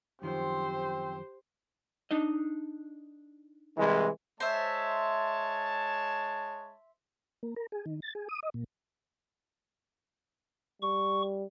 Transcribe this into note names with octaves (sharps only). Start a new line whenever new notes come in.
F#2 D#3 F3 C4 G4 C5
D4 D#4 D#5
C2 E3 G#3
G#3 C5 C#5 E5 A5
A#3
A#4
G#4
D#3
A6
G#4
D#6
D#5
A#2
G3 C#6